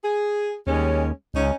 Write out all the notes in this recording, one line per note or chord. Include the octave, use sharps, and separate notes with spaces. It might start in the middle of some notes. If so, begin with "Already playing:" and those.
G#4
D#2 G3 G#3 C#4
C#2 C#4 D#4